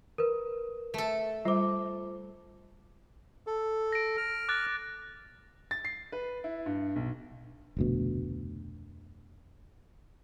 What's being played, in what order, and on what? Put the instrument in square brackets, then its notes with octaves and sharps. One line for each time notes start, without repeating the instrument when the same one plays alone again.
[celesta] A#4 B4
[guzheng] A3 A4
[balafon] G3 [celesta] F4 C5 D6
[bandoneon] A4
[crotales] A#6 D7
[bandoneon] F6
[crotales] D6 F#6 A6
[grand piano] A6
C7
B4
E4
G2
B1
[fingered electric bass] F1 D2 B2